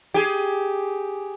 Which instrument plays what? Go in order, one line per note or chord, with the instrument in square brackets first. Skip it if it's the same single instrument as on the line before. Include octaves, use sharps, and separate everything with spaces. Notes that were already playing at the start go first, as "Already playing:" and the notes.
[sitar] G4 G#4